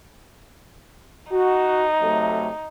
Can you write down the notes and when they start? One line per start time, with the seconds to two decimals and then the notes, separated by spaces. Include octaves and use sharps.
1.32 D#4 F#4
2.01 C3 F#3 A3